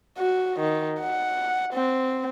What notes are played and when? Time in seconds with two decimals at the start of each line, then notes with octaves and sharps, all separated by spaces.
0.18 F#4
0.59 D#3
1.01 F#5
1.73 C4